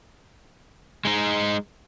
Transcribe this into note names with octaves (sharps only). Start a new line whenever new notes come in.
G#3 D#4